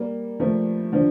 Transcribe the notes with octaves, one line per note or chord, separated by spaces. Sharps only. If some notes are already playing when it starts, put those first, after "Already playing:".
Already playing: G3 A#3
F3 A3
D3 F3